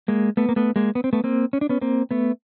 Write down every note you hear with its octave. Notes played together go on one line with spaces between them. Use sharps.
G#3 A#3
A3 B3
A#3
A3 B3
G#3 A#3
B3
C4
A3 B3
A#3 C4
C#4
D4
B3 C#4
A#3 C4
A3 B3